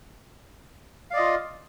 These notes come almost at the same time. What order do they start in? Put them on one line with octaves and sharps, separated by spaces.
F5 D5 D#5 F4